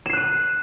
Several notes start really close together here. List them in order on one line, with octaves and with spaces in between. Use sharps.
E7 C7 F#6 D#7